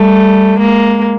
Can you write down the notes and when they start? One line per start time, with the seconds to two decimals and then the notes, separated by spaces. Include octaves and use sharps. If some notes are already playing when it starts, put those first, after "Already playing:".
Already playing: G3 A3
0.59 G#3 A#3